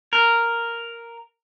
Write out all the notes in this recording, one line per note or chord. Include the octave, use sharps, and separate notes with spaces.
A#4